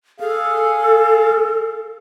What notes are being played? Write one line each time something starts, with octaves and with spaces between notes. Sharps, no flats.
G#4 A4 F5